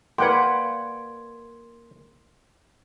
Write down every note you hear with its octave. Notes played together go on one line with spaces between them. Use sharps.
A#3 B4 D5 F#5 G5 C6 G#6